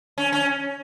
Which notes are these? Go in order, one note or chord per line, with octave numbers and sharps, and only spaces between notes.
C#4
C#4